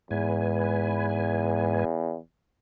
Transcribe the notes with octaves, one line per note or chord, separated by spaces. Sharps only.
E2 G#2 B4 G#5